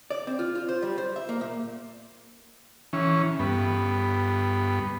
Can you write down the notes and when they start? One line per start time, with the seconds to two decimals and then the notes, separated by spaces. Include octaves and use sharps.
0.10 D5
0.27 C4
0.39 F4
0.55 F4
0.69 C5
0.83 G3
0.98 C5
1.16 E5
1.29 A#3
1.41 A#2
2.93 E3 C#4
3.39 G2 B3